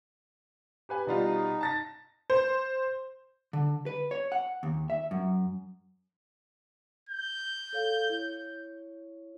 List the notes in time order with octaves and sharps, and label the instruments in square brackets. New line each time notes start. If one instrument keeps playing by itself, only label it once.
[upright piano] G4 B4 G#5
[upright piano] B2 G3 F4 [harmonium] D#4
[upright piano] A5 A6 A#6
[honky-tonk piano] C5
[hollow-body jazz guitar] D3
B4
C#5
F#5
D#2
E5
F#2
[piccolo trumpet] G6
[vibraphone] A4 C#5 F5
E4 C#5